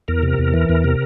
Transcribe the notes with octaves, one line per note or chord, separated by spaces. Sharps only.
E2 A#4
C3
E2
E3
E2
C3